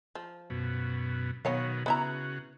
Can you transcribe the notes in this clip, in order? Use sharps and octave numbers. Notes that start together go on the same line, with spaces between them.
F3
F#2 B2
B2 D#3 F#3 B3 C#5 F5
C#3 B3 E4 F#4 A#5